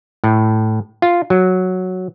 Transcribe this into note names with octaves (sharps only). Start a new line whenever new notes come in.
A2
F4
F#3